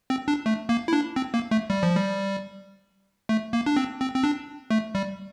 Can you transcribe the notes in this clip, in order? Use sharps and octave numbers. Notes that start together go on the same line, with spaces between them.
C4
D4
A3
A#3
E4
D4
C4
A#3
A3
G3
F3
G3
A3
A#3
D4
C4
C4
C4
D4
A3
G3